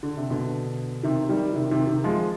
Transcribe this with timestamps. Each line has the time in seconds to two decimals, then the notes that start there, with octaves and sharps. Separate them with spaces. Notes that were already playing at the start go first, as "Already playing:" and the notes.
0.03 D3
0.17 C3
0.30 B2 D3
1.03 C3 D#3
1.29 D#3 G3
1.53 C3 D#3
1.71 C3 D#3
1.87 C3 D#3
2.04 F3 G#3